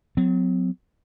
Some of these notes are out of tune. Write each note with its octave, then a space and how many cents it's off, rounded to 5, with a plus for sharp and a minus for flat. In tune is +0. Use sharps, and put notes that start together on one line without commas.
F#3 -20 C4 -45